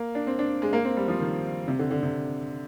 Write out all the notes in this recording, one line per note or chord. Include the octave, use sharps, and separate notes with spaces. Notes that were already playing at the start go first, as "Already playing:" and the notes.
Already playing: A#3
D4
C4
D4
G#3
A#3
C4
G3
F3
D#3
C3
D3
D3
C3